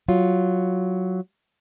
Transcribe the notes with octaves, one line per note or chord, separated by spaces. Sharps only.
F#3 F4